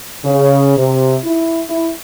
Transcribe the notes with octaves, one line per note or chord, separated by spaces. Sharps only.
C#3
C3
E4
E4